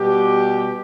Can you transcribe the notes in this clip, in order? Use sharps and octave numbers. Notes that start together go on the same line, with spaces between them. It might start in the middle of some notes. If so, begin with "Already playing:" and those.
Already playing: B2 G3 G4